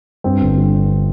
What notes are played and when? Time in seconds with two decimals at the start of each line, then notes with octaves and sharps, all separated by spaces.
0.24 G2 C4
0.41 G1
0.58 G2
0.73 D3